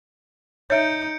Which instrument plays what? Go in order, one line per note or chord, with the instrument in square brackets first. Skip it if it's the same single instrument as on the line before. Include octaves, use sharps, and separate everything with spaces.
[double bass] D#4 [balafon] C#5 E5 [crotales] G6 C#7 D7